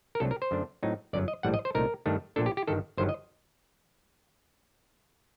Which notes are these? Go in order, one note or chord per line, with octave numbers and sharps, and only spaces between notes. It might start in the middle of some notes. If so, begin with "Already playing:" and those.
A#4
C2 C3 F#3 A3 D4 A4
A#4
C5
F#2 D3 A3 D4
A2 F#3 C4 D#4
G1 F#2 F#3 D5
D#5
A#1 A2 G3 F#5
D#5
C5
C2 A#2 A3 D#4 A#4
G2 D#3 A3 D4
A#1 A#2 A3 D4 A4
G4
G4
G1 G2 D#3 A4
G1 G2 D#3 F#3 C5
D#5